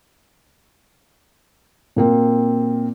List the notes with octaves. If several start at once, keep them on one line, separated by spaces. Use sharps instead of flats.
A#2 A#3 C4